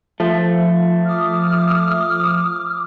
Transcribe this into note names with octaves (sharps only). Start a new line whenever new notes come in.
F3 A3
D6 D#6 F6